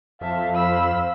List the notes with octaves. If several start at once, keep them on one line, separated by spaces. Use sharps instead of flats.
F2 C5 E5 F5 A5
C5 B5 E6